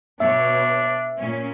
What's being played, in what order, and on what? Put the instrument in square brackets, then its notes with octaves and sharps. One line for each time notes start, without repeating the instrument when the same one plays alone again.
[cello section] B2 C#5 [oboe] D4 [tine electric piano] E5
[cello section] A#2 C#4